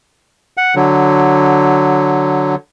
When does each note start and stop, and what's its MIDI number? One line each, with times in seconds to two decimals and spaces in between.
0.57 0.75 78
0.75 2.55 50
0.75 2.55 54